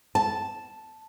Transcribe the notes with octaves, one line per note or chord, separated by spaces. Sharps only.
A5